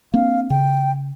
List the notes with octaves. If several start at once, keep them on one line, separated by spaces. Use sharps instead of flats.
A#3 C4 D4 F5
C#3 G5